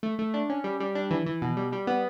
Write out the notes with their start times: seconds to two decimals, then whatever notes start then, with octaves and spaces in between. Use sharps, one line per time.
0.03 A3
0.19 A3
0.34 D4
0.50 C#4
0.64 G3
0.80 G3
0.95 D4
1.11 E3
1.26 E3
1.42 B2
1.57 G3
1.72 G3
1.87 B3